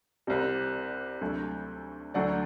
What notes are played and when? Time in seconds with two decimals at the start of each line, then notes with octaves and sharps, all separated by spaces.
0.27 C2 C3 G3
1.21 D2 C3 F#3 A3
2.14 D2 D3 F#3 A3 D5 F#5